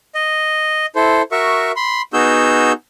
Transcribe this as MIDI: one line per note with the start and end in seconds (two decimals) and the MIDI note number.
0.15 0.86 75
0.96 1.22 64
0.96 1.22 69
0.96 1.22 72
1.32 1.72 66
1.32 1.72 70
1.32 1.72 76
1.32 1.72 85
1.76 2.02 83
1.76 2.02 84
2.13 2.72 59
2.13 2.72 63
2.13 2.72 66
2.13 2.72 68
2.13 2.72 88
2.13 2.72 91